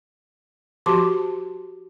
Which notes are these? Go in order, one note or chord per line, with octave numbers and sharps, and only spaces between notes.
F3 F#4 G4 A5 C6 D6